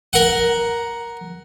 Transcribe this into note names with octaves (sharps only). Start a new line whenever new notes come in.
A#4 F#5